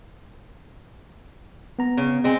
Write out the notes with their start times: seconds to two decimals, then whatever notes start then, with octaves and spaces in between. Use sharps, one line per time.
1.79 B3 A#5
1.97 C#3
2.24 G#3 C4